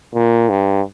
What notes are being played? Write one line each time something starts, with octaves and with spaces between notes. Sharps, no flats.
A#2
G2